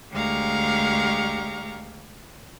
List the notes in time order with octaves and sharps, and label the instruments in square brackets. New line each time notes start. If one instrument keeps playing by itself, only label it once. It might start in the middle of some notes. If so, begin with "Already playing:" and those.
[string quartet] D2 G#3 G4 F5 A#5 C#6